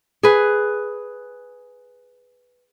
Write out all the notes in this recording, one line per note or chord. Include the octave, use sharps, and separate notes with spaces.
G#4 B4